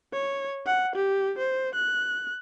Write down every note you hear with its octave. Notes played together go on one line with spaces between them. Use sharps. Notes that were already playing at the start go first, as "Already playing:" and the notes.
C#5
F#5
G4
C5
F#6